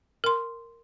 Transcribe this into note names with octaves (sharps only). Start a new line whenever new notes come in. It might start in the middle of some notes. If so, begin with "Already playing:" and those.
A#4 C6